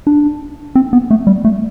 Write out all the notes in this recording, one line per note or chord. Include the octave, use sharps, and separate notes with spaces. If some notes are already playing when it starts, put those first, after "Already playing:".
D4
C4
B3
A3
G3
A3